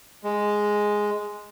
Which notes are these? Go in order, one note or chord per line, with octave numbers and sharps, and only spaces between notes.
G#3